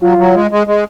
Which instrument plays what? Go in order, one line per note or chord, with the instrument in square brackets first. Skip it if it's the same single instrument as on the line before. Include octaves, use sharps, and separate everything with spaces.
[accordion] F#3 [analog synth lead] F4
[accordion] F#3
G#3
G#3
G#3